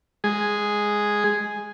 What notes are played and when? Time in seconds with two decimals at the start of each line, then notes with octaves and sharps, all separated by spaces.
0.24 G#3 G#4